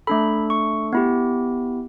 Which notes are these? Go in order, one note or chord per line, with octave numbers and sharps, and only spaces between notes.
A3 D4 A4 B5
C#6
B3 E4 G4